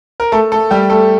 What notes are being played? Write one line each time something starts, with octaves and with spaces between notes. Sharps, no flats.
A#4
A3 A4
A3 A4
G3 G4
A3 A4